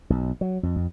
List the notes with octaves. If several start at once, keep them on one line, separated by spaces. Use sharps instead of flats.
B1
F#3
F2
F2